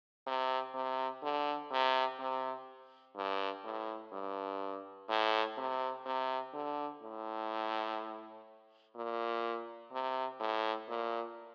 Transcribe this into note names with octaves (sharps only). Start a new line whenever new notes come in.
C3
C3
D3
C3
C3
G2
A2
G2
A2
C3
C3
D3
A2
A#2
C3
A2
A#2